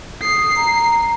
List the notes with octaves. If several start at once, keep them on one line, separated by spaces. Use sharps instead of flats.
D#6 C7
A#5